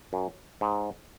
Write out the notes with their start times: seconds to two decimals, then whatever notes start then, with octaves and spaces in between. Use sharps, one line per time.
0.13 F#2
0.61 G#2